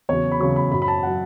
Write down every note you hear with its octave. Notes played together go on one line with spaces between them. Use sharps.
E2 C#3 F#3 C#5
B5
E2 C#3 F#3 C#6
B5
F#2 F#3 B5
B5
A5
F#3 F#5